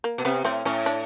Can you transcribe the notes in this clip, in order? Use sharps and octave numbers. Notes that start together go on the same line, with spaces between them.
A#3
B2
C3 B3
A2 C4
A2 C#4
D4